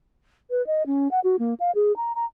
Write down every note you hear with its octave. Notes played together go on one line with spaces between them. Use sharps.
B4
D#5
C#4
F#5
F#4
A#3
F5
G#4
A#5
A#5